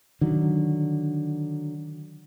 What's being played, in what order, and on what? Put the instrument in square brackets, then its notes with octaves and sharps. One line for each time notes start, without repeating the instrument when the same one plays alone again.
[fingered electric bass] D3 F#3 [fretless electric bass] D#3